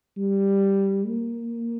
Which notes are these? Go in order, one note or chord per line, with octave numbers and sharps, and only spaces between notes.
G3
A#3